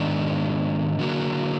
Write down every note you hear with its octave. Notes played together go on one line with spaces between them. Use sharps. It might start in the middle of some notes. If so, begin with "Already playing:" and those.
Already playing: G#2 D#3 G#3 B3 D4
D3 F#3 A#3